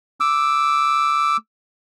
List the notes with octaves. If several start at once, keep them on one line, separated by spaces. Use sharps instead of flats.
D6 E6